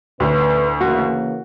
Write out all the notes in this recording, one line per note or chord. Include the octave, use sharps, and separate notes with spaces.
D2 A2 C#4 B4
C#3 E3 A#3 F#4